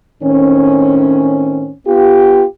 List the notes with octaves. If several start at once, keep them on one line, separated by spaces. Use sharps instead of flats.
A2 D#3 C4 C#4
B3 F4 G4